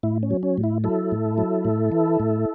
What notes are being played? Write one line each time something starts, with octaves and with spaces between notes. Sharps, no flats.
A2 E4
C#4
F#3
C#4
A2
E4
F#3 E4 A4
A2
F#3
A2
E3
A2